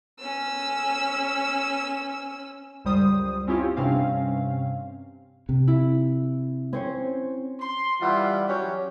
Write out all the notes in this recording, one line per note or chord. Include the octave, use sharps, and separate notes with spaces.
C#4 E6
C#2 F#2 G3 C5 D#6
C4 C#4 E4 F4 G4
G2 C3 C4 C#4 F5
C3
E4
C4 C#4 C5 C#5
C6
E3 G3 F4 E5 F#5
F#3 C#4 F#4 G4 C#5